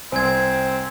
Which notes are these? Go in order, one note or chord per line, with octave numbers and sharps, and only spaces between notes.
C2 C4 C5 G#5 G#6